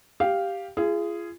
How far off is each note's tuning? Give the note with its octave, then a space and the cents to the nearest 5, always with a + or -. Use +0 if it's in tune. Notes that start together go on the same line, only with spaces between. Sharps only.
G4 +0 F5 +0
F4 -35 G#4 +0